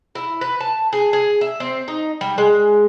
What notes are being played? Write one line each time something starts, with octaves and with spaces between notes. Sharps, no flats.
E4
B4
A5
G#4
G#4
E5
C4
D#4
G3
G#3